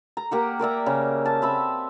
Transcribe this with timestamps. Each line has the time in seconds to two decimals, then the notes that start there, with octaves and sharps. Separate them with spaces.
0.17 A#5
0.31 A#3 G4 F#5
0.59 A#4 D5 E5 A#5
0.86 C#3
1.26 A5
1.42 C4 E5 B5